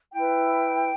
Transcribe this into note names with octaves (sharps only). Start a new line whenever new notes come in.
E4 B4 G5